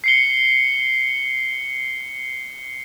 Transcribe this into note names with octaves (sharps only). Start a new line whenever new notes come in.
C7 C#7 G7